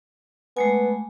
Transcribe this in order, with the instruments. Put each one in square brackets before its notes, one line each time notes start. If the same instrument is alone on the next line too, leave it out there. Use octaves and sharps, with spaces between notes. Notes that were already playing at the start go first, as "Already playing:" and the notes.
[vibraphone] G#3 A3 G#5 [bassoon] B3